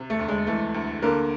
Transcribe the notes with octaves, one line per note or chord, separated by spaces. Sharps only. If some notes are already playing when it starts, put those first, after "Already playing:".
Already playing: C3
A3
D2
G#3
E3 A3
D2
D3 A#3